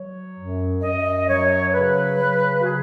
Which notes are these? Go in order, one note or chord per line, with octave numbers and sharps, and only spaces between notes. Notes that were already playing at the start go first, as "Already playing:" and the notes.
Already playing: F#3 C#5
F#2
F#2 D#5
F#3 C#5
C#3 B4
F#3
F#4
C#3 G#4